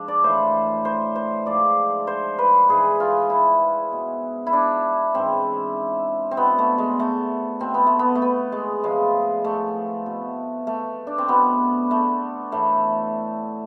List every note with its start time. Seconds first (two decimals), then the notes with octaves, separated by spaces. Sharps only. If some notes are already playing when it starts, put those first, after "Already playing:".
Already playing: G#2 F3 D4
0.08 D5
0.24 A2 E3 C5
0.85 C5
1.15 C5
1.46 G#2 F3 D5
2.07 C5
2.38 B4
2.68 G#2 E3 G#4
3.00 F4
3.30 E4
3.92 B2
4.46 E4
4.53 D4
5.15 G#2 E3 C4
6.31 C4
6.37 B2 B3
6.58 A3
6.78 G#3
7.00 A3
7.60 B2 C4
7.74 B3
7.87 A3
7.99 B3
8.15 A3
8.22 B3
8.52 G#3
8.83 A2 F3 G#3
9.44 A3
10.06 B2
10.67 A3
11.07 D4
11.18 C4
11.28 B2 B3
11.91 A3
12.52 A2 E3 A3